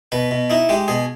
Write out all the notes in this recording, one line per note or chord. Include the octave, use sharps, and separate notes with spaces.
B2 B4
B2
D#4 E4
G#3 G4
B2 G#4